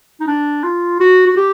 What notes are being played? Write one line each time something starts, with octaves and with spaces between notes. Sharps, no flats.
D#4
D4
F4
F#4
F#4
G4